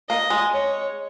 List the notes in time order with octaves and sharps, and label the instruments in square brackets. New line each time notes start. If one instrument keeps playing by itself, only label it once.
[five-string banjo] A#3 [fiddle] D#5
[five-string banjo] G#3
[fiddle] C#5